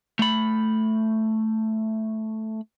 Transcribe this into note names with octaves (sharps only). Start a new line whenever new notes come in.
A3 B5